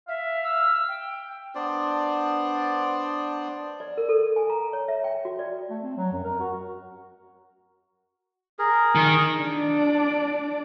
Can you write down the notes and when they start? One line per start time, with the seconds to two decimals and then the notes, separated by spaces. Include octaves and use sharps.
0.08 E5 F5
0.43 E6
0.88 G5
1.55 B3 D4 C5 D5
3.80 D5
3.97 A#4
4.09 A4
4.36 G#5
4.50 A#5
4.73 C#5
4.88 E5
5.04 G5
5.25 F#4
5.39 D5
5.70 A3
5.83 C4
5.98 F#3
6.12 F#2
6.24 A#4
6.40 F#4
8.59 G#4 A#4
8.95 D#3
9.38 D4 D5